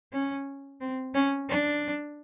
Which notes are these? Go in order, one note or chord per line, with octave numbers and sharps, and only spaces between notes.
C#4
C4
C#4
D4